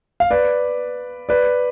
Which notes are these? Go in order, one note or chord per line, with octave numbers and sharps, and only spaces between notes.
F5
B4 D5
B4 D5